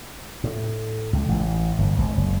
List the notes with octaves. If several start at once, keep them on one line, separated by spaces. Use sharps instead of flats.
A2
C#2
A1
G1
G#1
F#1